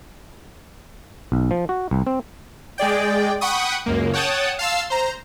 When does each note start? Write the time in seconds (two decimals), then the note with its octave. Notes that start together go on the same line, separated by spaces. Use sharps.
1.32 B1
1.51 F3
1.69 F#4
1.91 C2
2.07 C4
2.78 G#3 G#4 D5 G5
3.41 F#5 G5 B5 C#6 D#6
3.86 C#2 F#2 A#3
4.14 C#5 F#5 G5 A5 D#6
4.59 F5 A5 C6 E6
4.90 C5 A#5